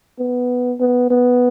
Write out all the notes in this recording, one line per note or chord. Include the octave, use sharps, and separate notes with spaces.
B3
B3
B3